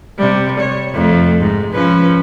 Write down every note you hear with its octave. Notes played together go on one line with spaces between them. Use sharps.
C3 G3
C#5
F2 A3
G#2
F3 C#4 B4